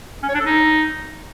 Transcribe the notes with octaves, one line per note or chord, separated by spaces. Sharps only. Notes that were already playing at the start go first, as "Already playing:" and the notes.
C#4
C#5
D4
A4
D#4